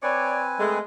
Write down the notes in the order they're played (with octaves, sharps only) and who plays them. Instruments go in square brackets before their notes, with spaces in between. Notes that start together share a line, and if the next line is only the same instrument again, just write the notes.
[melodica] C4 B4 G#5 [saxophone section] C#5 D5
[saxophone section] G#3 A3